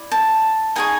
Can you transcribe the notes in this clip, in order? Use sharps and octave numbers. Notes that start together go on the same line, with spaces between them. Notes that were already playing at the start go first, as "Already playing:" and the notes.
Already playing: E4 D5
A5
D#4 G#4 C#5 G#5